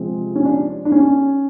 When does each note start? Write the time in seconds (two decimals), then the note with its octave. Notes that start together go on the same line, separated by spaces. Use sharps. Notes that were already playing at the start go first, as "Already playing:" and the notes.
Already playing: C3 F3 G#3 C4
0.36 C#4
0.45 D4
0.85 D4
0.92 C#4